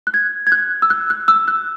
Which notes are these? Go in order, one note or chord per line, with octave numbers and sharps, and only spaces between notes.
F#6
G#6
G#6
F#6
E6
F#6
F#6
E6
F#6